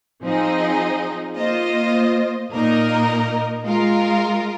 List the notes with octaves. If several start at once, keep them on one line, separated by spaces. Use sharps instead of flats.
F3 C4 D#4 G#4 D#5
A#3 F4 C5 D#5
A#2 A#3 D#4 A#4 D#5
G#3 F4 A#4